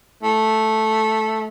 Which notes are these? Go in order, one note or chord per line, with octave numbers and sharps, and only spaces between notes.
A3